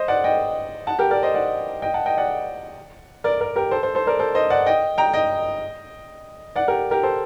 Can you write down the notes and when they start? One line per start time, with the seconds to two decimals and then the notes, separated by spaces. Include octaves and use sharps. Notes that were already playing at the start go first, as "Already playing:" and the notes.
Already playing: C5 D#5
0.08 D5 F#5
0.24 D#5 G5
0.87 F#5 A5
0.99 G4 A#4
1.11 A#4 D5
1.23 C5 D#5
1.34 D5 F#5
1.82 D#5 G5
1.94 F#5 A5
2.06 D#5 G5
2.17 D5 F#5
3.24 A#4 D5
3.40 A#4 D5
3.56 G4 A#4
3.71 A4 C5
3.83 A4 C5
3.95 A4 C5
4.07 A#4 D5
4.19 A4 C5
4.35 C5 D#5
4.50 D5 F#5
4.66 D#5 G5
4.98 G5 A#5
5.13 D#5 G5
6.56 D5 F#5
6.68 G4 A#4
6.91 G4 A#4
7.03 A4 C5